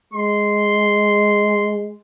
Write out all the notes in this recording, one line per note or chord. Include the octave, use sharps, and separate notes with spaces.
G#3 C6